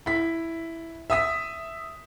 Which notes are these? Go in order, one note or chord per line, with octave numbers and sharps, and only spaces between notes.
E4 B6
E5 D#6 B6